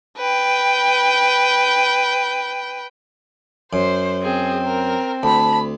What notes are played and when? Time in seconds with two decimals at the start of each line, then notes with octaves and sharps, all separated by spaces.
0.18 B4 G5
3.73 F#2 C5
4.22 C4 G#4
4.66 A#4
5.23 D2 A5 B5